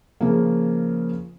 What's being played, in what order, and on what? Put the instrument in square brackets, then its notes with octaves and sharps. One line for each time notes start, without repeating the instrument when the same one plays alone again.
[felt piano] C#3 F3 A#3